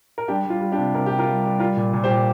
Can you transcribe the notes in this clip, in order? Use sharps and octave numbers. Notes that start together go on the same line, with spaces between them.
A#4
G3 D4 G4
G3
F4
G3
D4 G4
C3
C3 A#4
C3 G4
F4 A#4
G3
G3
G3 F4 A#4
A#2
A#2
G4 C5
A#2